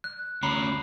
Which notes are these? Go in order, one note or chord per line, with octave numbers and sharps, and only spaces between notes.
F#6
D2 C#4 A#5 B5 C7